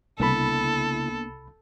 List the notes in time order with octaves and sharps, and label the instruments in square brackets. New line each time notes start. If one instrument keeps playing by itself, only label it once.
[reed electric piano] C2 B5 [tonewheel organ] C#3 E4 [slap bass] A#3 B3 D4 [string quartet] A4